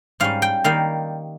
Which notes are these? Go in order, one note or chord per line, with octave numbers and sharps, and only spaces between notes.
G#2 G3 C#4 F5
G5
D#3 G3 A#3 F5